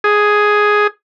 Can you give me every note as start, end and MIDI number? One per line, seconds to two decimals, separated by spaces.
0.04 0.87 68